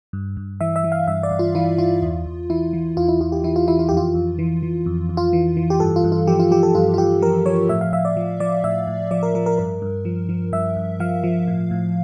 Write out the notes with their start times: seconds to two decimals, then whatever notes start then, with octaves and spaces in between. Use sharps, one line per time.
0.13 G2
0.37 G2
0.61 E3 E5
0.76 E5
0.84 E3
0.92 F5
1.08 G2 E5
1.23 D5
1.31 G2
1.39 F4
1.55 E3 E4
1.78 E3 F4
2.02 E2
2.26 E2
2.50 E3 E4
2.73 E3
2.97 E2 F4
3.08 E4
3.21 E2 F4
3.32 G4
3.44 E3 E4
3.56 F4
3.68 E3 E4
3.79 F4
3.89 F2 G4
3.97 F4
4.15 F2
4.39 E3
4.63 E3
4.86 F2
5.09 F2
5.17 F4
5.33 E3
5.57 E3
5.70 G4
5.80 G2 A4
5.96 F4
6.04 G2
6.12 F4
6.27 F3 G4
6.40 F4
6.51 F3 G4
6.63 A4
6.75 G2 F4
6.94 F4
6.98 G2 G4
7.22 F3 A#4
7.46 F3 C#5
7.69 A2 E5
7.81 F5
7.93 A2 E5
8.05 D5
8.17 F3
8.40 F3 D5
8.64 A2 E5
8.88 A2
9.11 F3 D5
9.23 A#4
9.35 F3 A#4
9.46 A#4
9.58 G2 A#4
9.82 G2
10.05 F3
10.29 F3
10.52 G2 E5
10.77 G2
11.00 F3 F5
11.24 F3
11.48 A2
11.71 A2